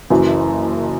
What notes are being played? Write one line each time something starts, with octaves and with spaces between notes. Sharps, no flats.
F#1 F#2 E3